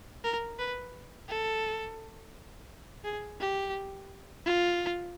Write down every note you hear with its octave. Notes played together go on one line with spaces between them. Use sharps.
A#4
B4
A4
G#4
G4
F4